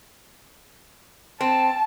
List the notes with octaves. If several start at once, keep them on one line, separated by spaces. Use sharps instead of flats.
C4 A5